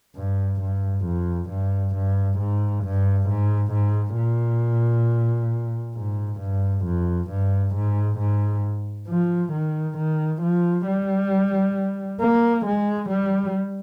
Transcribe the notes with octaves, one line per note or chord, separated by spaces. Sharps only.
G2
G2
F2
G2
G2
G#2
G2
G#2
G#2
A#2
G#2
G2
F2
G2
G#2
G#2
F3
D#3
D#3
F3
G3
A#3
G#3
G3